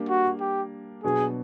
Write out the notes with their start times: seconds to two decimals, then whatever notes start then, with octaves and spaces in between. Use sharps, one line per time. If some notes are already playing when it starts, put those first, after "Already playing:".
Already playing: G3 A#3 D4 G4
0.09 F#4
0.40 G4
1.04 B2 F#3 B3 D4 G#4